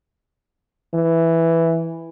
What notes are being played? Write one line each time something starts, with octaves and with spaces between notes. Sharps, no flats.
E3